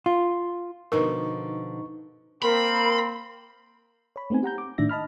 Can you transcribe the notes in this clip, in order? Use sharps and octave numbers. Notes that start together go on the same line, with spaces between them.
F4
B2 D3 F3 D#4 A#4 C#6
A#3 C4 A#4 B5 C6
C#5 B5
A3 B3 C4 D#4 G#5
G4 F#5 A#5 G6
D6
A2 D#3 D4 E5 A#6
D#5 A5 B5 F6